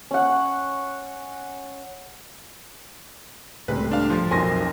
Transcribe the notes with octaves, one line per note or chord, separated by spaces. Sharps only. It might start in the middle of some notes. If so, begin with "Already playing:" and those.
C#4 F#5
C#2 A2 G3 A3 C4 G4 B4
D4 F5
F3 C6 A6
B1 F2 F#3 C4 A#4 G#5 C6 A#6